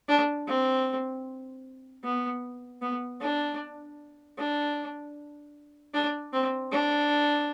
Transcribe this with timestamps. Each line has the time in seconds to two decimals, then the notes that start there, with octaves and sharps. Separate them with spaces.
0.08 D4
0.48 C4
2.04 B3
2.82 B3
3.21 D4
4.38 D4
5.94 D4
6.33 C4
6.72 D4